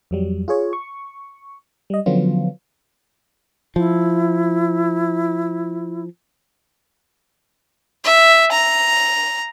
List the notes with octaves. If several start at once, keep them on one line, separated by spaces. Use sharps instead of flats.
F2 F#3 G3
F4 G#4 C#5
C#6
G3 D#5
D3 F3 F#3 B3 C#4 F4
F3 E4
E5
A#5